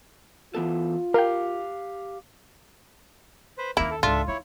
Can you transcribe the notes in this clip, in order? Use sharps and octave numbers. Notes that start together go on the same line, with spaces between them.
E3 B3 F4 A4
G4 A#4 F5 G5
B4 C5
D#2 A#3 C#4 E4 A#4
A4
C#2 G#2 D4 F4 A4 E5
D#4 E4 C#5